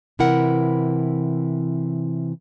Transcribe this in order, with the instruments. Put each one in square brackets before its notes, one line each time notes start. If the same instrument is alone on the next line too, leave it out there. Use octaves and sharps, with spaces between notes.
[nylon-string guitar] C3 E3 E4 A#4 F#5